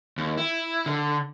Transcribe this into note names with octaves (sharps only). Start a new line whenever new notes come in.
D#2
E4
D3